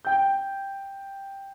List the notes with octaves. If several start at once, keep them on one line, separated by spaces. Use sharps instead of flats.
G5 G6